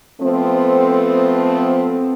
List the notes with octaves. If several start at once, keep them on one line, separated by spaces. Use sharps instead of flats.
F3 A3 B3 C4